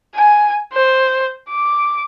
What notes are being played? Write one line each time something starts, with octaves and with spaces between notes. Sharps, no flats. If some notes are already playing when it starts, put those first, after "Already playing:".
G#5
C5
D6